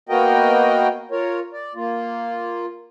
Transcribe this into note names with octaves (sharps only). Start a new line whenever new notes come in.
A#3 B3 F#4 A#4 D#5 G5
F4 A#4 C#5
D5
A#3 F4